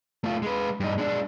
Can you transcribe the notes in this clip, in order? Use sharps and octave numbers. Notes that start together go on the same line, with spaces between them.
A3 F4
G#3 B4
G2 D#4
G#3 D4